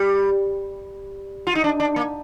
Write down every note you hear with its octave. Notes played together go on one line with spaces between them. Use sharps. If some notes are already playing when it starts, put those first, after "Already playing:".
Already playing: G3
F4
D#4
D4
D4
A#3